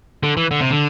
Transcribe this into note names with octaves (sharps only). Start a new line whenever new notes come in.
D3
E3
D3
C3
D3